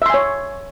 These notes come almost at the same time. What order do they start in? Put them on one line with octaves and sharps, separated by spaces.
E5 C6 G#5 C#5